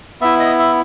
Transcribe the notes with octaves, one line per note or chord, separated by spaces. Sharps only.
B3 E4 E5
D#5
E5